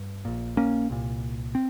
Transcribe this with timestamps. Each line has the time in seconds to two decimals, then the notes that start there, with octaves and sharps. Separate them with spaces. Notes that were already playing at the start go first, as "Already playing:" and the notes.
Already playing: G2
0.25 A#1 A#2
0.57 A#3 C#4
0.90 C2 A#2
1.55 C4